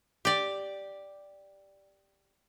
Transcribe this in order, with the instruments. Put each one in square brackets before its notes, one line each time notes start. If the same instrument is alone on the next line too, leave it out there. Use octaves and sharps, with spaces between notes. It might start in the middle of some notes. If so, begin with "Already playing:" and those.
[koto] G4 D5